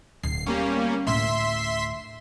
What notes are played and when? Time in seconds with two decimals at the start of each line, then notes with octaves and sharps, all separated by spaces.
0.23 D1 C7
0.46 G3 A#3 B3 C#4
1.07 D2 A2 E5 C6 B6